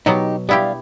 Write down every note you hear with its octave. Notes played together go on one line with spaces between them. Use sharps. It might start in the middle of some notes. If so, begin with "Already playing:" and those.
B2 F#3 B3 D#4 G4
G3 B3 E4 G4 D5 F5